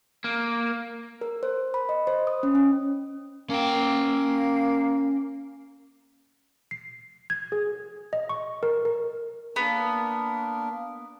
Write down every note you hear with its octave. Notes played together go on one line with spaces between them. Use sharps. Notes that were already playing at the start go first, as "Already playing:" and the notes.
A#3
A#4
C5
B5
D#5
C5
D#6
C#4
C#4
A#3 C#4 G5
C7
G#6
G#4
D#5
C#6
A#4
A#4
A#3 B3 D4 A#4